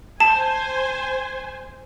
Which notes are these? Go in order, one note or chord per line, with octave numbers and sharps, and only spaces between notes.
C5 G#5 A5